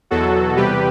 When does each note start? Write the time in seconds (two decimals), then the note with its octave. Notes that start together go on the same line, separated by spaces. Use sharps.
0.11 E2 B2 F#3 F#4 A4
0.57 E2 C3 G3 G4 B4